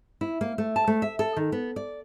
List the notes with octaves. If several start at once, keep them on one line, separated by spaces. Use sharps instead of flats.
E4
A#3
A3
A5
A3
E5
A4
D#3
B3
D5